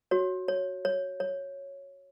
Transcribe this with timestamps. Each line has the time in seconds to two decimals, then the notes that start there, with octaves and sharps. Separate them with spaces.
0.11 F#4 C#5
0.48 C#5
0.85 C#5
1.20 C#5